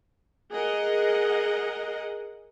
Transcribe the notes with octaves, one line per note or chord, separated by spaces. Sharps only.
G#4 A#4 D#5 F#5